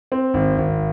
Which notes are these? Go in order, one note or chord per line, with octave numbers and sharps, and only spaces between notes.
C4
G#1
G#1